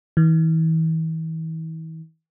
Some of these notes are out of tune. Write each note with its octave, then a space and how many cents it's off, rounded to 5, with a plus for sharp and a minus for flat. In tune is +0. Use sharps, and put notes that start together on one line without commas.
E3 -40